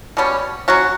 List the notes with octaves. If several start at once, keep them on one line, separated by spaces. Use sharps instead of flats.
B2 G3 C#4
F#3 C#4 F#4